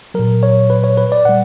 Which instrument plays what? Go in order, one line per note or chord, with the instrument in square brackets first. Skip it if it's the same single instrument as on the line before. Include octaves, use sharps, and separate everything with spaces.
[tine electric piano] A#2 F#3 A#4
C#5
B4
C#5
B4
D5
A#2 G3 F#5